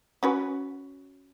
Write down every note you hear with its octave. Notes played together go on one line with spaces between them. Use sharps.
C#4 F#4 B4